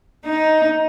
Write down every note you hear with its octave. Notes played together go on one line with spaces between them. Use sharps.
D#4